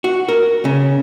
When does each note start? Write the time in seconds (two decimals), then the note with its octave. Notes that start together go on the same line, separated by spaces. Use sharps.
0.04 F#4
0.29 A#4
0.65 C#3